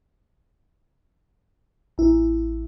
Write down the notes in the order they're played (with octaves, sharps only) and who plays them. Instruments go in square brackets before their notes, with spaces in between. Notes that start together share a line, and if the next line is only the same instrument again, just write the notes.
[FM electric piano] A1 E4